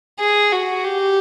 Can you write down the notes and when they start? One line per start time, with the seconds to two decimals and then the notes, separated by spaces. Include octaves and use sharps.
0.19 G#4
0.52 F#4
0.84 G4